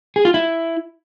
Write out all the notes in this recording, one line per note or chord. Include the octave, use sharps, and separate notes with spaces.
G#4
F4
E4